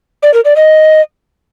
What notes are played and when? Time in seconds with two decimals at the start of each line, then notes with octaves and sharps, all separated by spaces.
0.23 D5
0.34 A#4
0.45 D5
0.56 D#5